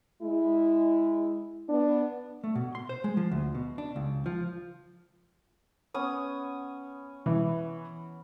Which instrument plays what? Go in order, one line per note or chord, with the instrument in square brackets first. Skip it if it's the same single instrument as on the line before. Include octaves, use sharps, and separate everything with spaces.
[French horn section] G#3 E4
B3 D4
[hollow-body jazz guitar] A3
B2
C6
C5
G#3
F3
D2
B2
D4
C#2
F3
[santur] B3 C#4 D#6
[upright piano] E3